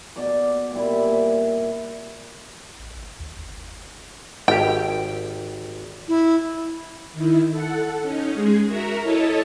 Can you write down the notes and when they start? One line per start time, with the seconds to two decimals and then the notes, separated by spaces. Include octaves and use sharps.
0.16 B2 D5 A5 D6
0.71 A#2 G3 E4
2.79 A1
2.97 G#1
3.19 D#2
3.37 G1
4.48 G#1 G4 G5
6.08 E4
7.13 D#3 E4
7.51 A4 F#5
8.01 C#4 D#4
8.34 G#3 G#4
8.66 F#4 A#4 E5 A#5
9.02 E4 A4 C#5 D#5 A5